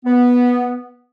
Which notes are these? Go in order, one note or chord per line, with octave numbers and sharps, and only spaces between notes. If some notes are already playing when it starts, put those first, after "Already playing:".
B3